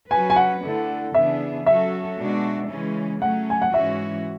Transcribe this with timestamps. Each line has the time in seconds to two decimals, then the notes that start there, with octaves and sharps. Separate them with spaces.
0.10 F#3 C#4 F#4 B4 G#5
0.30 G#5
0.36 F#5
0.62 D3 A3 E4 A4
1.14 C#3 E3 B3 D4 G#4 E5
1.66 F#3 C#4 F#4 A4 E5
2.19 B2 G#3 D4 F#4
2.70 C#3 E3 G#3 C#4
3.22 F#3 A3 C#4 F#5
3.50 G#5
3.62 F#5
3.74 G#2 E3 G#3 C#4 F#4 E5